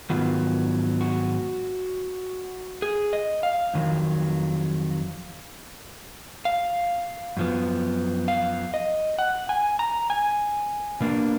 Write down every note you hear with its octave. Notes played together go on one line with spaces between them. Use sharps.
G#2 D#3 F#3 B3 F4
F#4
G#4
D#5
F5
F2 D#3 F#3
F5
F#2 F3 B3
F5
D#5
F#5
G#5
A#5
G#5
B2 A#3 D4